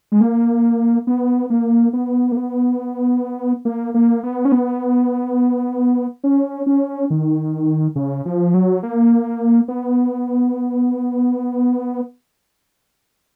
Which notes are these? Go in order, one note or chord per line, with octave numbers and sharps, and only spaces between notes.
G#3
A#3
B3
A#3
B3
A#3
B3
A#3
A#3
B3
C#4
B3
C#4
C#4
D#3
C#3
F3
F#3
A#3
B3